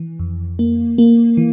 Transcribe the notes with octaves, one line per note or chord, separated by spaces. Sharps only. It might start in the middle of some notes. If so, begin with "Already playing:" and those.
Already playing: E3
F2
A#3
A#3
E3